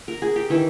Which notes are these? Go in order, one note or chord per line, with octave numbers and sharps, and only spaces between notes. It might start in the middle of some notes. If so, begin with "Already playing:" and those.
A#4
G#4
G4
D#3 E3 E4